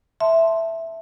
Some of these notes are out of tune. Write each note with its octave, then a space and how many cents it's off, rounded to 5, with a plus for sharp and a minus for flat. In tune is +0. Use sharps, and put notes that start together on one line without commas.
E5 +0 A5 +0 C6 +0